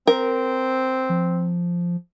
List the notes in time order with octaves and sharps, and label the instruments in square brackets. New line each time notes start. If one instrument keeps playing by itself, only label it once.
[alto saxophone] C4 [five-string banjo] A#4
[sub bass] F3